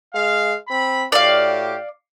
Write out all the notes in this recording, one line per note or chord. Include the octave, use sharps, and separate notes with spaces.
G#3 F5
C4 B5
A2 F#4 G4 D5 F5